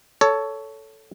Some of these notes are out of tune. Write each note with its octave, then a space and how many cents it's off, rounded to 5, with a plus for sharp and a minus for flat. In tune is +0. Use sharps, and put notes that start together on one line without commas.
A4 +0 C#5 +15